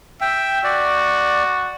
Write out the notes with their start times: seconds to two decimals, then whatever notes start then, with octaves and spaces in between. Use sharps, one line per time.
0.21 E5 G5
0.64 F#4 D5